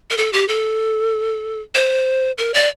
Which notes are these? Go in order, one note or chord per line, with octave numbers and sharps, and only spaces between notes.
A#4
A4
G4
A4
C5
A#4
D5